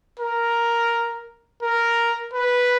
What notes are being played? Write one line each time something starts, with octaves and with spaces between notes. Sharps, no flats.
A#4
A#4
B4